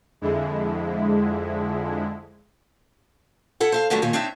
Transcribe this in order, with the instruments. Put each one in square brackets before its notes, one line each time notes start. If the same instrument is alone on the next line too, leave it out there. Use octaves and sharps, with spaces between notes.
[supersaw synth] F2 D3 G#3 E4
[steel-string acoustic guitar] E4 A4 F#5
C5 E5 F5
F#2 D3 F#3 G3 A3 B3
D#2 A#2 D#3 C#5
C4 D4 D#4 C#5 E5